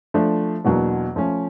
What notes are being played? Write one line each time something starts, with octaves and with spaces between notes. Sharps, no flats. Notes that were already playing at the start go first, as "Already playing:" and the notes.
F3 A3 D4
E2 B2 F#3 A#3 D4
F3 A3 C#4